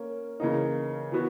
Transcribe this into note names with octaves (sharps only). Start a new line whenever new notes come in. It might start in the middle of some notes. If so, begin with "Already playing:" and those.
Already playing: A#3 C#4
C#3 E3 A#3 D#4
E3 B3 F#4